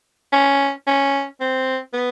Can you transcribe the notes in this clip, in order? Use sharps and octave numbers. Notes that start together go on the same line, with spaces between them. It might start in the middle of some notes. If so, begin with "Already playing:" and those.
C#4
C#4
C4
B3